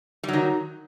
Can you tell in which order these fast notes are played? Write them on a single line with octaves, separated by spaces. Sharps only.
G3 F#3 D#3